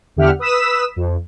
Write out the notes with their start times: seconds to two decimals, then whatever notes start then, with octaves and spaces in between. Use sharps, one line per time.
0.16 E2 D3 G4 E5 F#5 F6
0.39 B4 D#6 E6 B6 E7
0.96 F2